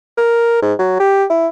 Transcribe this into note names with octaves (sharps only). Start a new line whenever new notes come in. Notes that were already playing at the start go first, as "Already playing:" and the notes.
A#4
G#2
F#3
G4
E4